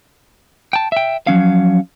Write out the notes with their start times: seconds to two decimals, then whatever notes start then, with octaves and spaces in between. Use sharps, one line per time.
0.73 G5 A5
0.92 E5 G5
1.27 F3 F#3 C#4 F5